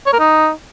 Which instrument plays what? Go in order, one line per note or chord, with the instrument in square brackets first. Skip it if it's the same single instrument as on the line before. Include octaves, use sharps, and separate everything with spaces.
[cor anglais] C#5
A#4
D#4